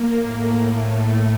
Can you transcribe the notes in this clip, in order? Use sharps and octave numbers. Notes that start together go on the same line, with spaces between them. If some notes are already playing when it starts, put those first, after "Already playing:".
Already playing: A#3
A2
A2 A3